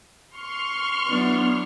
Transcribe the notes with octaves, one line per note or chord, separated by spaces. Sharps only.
C6 C#6 F6
F#3 B3 D4 E4